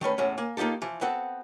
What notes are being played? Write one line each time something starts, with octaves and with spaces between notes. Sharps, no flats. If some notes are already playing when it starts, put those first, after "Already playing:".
D#3 A3 C#4 B4
E2 A2 C#4
A#3 G#5
A#3 D#4 F4 G4 A4
E3 F3
B3 C4 F#4 A4